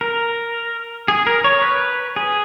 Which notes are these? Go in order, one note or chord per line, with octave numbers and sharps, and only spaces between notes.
A#4
G#4
A#4
C#5
B4
G#4